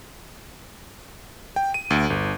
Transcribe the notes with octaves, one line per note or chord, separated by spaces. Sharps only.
G5
D#7
D2
G1